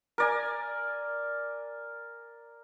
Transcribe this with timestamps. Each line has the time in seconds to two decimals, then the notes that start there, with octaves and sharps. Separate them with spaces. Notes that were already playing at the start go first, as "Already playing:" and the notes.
0.18 A#4 D5 G#5